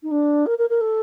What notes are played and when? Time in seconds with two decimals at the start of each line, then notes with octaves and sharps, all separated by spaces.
0.03 D#4
0.11 D4
0.46 A#4
0.58 A#4
0.69 A#4
0.81 A4